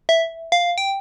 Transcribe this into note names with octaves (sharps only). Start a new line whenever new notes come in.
E5
F5
G5